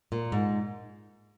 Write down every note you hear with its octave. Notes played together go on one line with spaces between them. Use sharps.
A#2
G#2